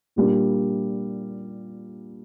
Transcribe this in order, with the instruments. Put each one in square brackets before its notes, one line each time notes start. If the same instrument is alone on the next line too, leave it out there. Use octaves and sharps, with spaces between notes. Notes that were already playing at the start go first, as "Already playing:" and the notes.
[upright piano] A#2 G3 A#3 D4